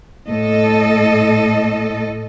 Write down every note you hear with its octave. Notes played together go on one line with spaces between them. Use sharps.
A2 A4 D#5